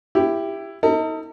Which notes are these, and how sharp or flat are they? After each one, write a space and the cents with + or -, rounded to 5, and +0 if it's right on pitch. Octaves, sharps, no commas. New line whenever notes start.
E4 +10 G4 +10
D#4 +35 A4 +45